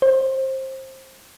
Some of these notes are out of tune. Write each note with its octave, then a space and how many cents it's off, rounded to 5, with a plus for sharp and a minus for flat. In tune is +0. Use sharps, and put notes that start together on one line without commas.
C5 +20